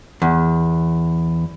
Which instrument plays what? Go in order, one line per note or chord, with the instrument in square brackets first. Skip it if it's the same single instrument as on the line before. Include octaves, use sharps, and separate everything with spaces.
[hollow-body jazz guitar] E2